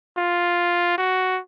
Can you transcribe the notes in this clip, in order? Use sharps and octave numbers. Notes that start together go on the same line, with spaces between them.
F4
F#4